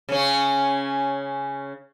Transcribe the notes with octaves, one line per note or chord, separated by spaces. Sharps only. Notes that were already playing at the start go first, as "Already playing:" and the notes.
C#3 C#4